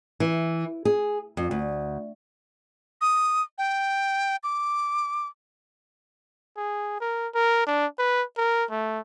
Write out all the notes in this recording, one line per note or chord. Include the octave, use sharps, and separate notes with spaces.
E3
G#4
F2
D2
D#6
G5
D6
G#4
A#4
A#4
D4
B4
A#4
A3